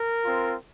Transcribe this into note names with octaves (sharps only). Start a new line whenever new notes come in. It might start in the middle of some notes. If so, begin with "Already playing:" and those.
Already playing: A#4
C4 F4